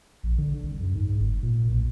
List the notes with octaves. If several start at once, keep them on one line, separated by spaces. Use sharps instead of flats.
A#1
D3
C2
F#2
G#2
G1
A#2
B1